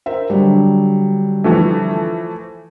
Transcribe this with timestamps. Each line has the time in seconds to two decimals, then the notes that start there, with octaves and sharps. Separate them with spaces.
0.06 A#4 C5 E5
0.30 D3 F#3 G3
1.44 E3 F3 A3